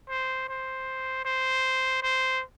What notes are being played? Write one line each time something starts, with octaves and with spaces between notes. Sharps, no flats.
C5
C5
C5
C5